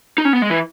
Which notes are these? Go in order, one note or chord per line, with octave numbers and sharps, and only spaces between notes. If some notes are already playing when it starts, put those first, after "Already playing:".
D#4
C#4
B3
G#3
E3